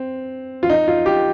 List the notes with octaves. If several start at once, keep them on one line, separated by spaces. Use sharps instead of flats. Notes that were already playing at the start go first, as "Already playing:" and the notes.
Already playing: C4
F4
D#4
F4
G4